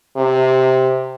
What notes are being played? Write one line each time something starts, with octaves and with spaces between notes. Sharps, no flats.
C3